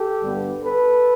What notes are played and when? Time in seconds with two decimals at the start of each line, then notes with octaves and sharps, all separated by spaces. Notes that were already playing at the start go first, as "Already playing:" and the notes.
Already playing: G4 A4
0.21 G2 D3 G3 B3
0.62 A4 B4